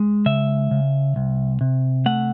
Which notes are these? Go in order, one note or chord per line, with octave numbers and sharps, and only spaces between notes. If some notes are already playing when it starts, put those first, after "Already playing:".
Already playing: G#3
C#3 E5
C#3
C2
C3
A3 F#5